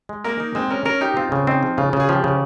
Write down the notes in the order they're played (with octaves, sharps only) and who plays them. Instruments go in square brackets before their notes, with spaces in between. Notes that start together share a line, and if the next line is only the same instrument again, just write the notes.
[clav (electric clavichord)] G#3
[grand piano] A#3 [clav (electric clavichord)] A#4
[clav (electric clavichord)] D#4
[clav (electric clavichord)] G#3 [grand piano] C4
[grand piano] C#4 [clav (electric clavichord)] A#4
[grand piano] C#4 [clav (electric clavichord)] A#4
[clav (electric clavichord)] D#4 [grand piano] G4
[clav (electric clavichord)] C4 [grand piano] F4
[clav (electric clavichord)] C#3
[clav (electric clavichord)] C4 [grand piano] D#4
[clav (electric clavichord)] F3
[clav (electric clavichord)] C#3 [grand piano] F4
[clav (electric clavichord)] C#3
[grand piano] G#4
[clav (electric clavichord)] F3 [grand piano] G4
[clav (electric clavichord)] C#3